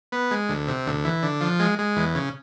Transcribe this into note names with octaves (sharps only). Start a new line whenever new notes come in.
B3
G#3
D2
C3
D2
E3
D3
F3
G#3
G#3
E2
C#3